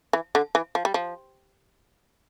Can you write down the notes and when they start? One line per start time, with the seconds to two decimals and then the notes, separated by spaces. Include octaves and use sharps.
0.13 E3
0.35 D3
0.55 E3
0.75 F3
0.85 G3
0.94 F3